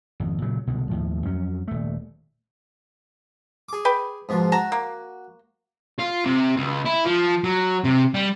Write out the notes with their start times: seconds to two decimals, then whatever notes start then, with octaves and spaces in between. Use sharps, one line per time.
0.20 G#1 F2
0.42 A#2 C#3 F#3
0.67 C2 B2 D3
0.89 D#2 A2 F3
1.26 F2 F#3 C#4
1.68 D#1 A3
3.69 G#4 D6
3.85 B4 G5
4.29 G#2 B2 F3
4.52 F#4 A5 A#5
4.72 A#3
5.99 F4
6.25 C3
6.57 C#2
6.86 E4
7.06 F3
7.44 F#3
7.84 C3
8.14 G3